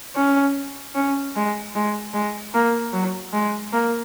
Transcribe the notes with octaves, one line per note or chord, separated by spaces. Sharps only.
C#4
C#4
G#3
G#3
G#3
A#3
F#3
G#3
A#3